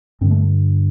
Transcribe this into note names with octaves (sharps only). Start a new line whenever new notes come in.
G2 D3 C4
A3